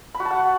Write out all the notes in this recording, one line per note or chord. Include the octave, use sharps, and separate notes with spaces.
B5
F#4
A5
F#5